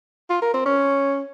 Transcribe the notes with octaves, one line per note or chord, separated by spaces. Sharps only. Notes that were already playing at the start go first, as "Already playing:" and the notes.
F4
A#4
C4
C#4